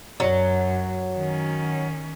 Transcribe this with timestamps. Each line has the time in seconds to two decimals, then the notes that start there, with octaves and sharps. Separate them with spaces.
0.20 F#2 F#3
1.15 D#3 C#4